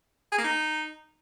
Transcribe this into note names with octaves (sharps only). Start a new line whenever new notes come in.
G#4
A#3
D#4